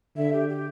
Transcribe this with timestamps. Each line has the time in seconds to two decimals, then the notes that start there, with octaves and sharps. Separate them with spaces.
0.17 D3 E5
0.33 G4
0.49 G4